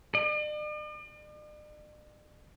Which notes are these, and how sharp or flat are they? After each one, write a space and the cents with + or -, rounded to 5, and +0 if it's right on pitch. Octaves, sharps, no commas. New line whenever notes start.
D5 +45